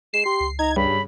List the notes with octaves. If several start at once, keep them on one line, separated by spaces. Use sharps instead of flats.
G#3 C7 E7
G4 C6
C#2
D#4 A#5 G#6
G2 C#3 B5